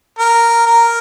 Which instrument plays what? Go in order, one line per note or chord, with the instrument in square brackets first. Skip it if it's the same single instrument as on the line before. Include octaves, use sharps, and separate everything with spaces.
[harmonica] A#4
A#4